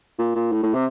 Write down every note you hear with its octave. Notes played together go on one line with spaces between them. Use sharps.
A#2
A#2
A2
A2
C3